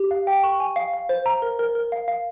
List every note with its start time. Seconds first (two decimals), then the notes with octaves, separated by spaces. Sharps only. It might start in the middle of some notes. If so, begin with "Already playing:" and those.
Already playing: G4
0.11 F5
0.27 G5
0.43 C#6
0.60 G#5
0.76 F5
0.93 F5
1.09 C5
1.26 A#5
1.42 A#4
1.59 A#4
1.75 A#4
1.92 F5
2.08 F5